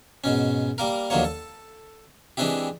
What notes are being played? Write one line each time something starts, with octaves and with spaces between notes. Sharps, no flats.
G#2 B2 C#4
G3 A#3 A#4
D#2 D3 F3 F#3 A#3 C#5
A4
E3 G#3 C4 D4 E4 G4